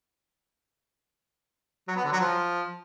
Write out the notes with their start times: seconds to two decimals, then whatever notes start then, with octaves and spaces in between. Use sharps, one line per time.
1.88 F#3
1.96 B3
2.04 D3
2.12 F#3
2.20 F3